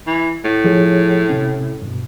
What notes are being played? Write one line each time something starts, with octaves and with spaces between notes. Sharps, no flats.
E3
A2
F3 G#4 C#5
C3 C#4
G2 B2